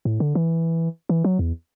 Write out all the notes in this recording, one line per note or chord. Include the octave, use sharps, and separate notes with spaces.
A2
D3
E3
E3
F#3
E2